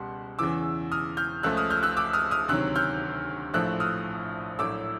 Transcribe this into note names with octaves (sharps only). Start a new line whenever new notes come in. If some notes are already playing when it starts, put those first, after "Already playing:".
Already playing: C#2 B2 G3 F#5 C6
E2 C#3 E3 D6 E6
D#6 F6
F6 G6
C#2 C#3 F3 A3 E6 F#6
D#6 F6
F6 G6
E6 F#6
D6 E6
D#6 F6
D#6 F6
D2 C3 D#3 F#3 E6 F#6
F6 G6
A#1 A2 F3 A3 E6 F#6
D#6 F6
A#1 A2 F#3 A3 D6 E6